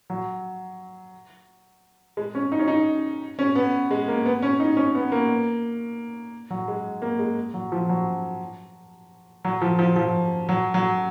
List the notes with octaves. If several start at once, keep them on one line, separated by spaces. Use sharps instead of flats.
F#3
G#3
C#4
D#4
C#4
D#4
C#4
B3
G#3
A#3
B3
C#4
D#4
C#4
B3
A#3
F#3
G#3
A#3
G#3
F#3
F3
F#3
F#3
F3
F3
F3
F#3
F#3